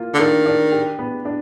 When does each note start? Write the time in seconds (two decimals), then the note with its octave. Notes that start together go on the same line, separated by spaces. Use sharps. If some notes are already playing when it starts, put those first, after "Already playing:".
Already playing: A#3 F4
0.14 D3
0.19 D#3 D4
0.46 D4
0.72 G4
0.99 B3
1.25 D4